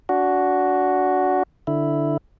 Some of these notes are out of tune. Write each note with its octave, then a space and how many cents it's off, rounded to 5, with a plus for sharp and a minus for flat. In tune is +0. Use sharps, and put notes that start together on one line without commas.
D4 -25 F#4 +0
D3 +0 E4 +0